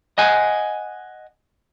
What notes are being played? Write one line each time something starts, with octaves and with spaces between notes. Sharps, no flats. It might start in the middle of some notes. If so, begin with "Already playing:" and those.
D#5 F#5 G#5